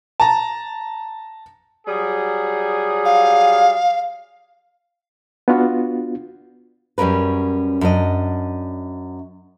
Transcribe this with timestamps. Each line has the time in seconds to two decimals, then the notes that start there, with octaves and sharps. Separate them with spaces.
0.20 A5 A#5
1.87 F#3 G3 G#4
3.05 F5
5.48 B3 D4 F4 F#4
6.98 F#2 G3 C#4 A#4 B4
7.81 F#2 D4 D#5